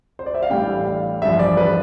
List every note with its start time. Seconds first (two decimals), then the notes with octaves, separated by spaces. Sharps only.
0.19 C5
0.26 D5
0.35 E5
0.43 F5
0.50 A1 A2 G3 D4 G5
0.86 F5
1.22 A1 G2 F3 E5
1.39 D5
1.57 B4